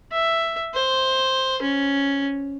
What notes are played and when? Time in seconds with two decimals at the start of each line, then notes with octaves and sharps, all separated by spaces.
0.12 E5
0.75 C5
1.62 C#4